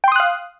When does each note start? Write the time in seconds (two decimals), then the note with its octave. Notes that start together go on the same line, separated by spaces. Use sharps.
0.04 G5
0.08 C6
0.12 D#6
0.16 F#6
0.20 F5